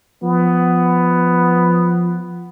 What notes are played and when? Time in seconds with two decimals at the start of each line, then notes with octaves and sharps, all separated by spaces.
0.23 F3 B3